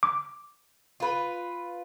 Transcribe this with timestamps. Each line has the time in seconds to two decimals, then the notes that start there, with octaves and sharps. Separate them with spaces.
0.03 D6
1.00 F4 B4